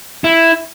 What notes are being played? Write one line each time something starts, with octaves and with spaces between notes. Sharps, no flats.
E4